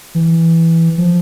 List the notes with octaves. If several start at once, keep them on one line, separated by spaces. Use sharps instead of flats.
E3
F3